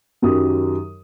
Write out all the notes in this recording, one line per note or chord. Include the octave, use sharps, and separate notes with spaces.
F#2 D#3 F#3 G4 D#6